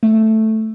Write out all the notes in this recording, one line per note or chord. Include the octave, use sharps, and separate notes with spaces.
A3